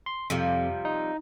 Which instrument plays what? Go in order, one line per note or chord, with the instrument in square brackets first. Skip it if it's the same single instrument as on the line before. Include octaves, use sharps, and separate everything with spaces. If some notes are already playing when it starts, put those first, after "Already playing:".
[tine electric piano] C6
[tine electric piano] F2 [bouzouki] C3 F3 G3
[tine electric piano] D#4